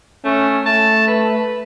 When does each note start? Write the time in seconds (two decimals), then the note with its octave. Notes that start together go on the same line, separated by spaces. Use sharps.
0.25 A3 C#4
0.66 A3 A5
1.07 B4